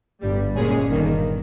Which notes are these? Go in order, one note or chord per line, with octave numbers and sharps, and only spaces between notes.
G1 G2 G3
A#2 G#3 C#4 G#4
G1 G2 D#3 A#3